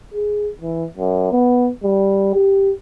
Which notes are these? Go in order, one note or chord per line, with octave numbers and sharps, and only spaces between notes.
G#4
E3
F#2
B3
G3
G4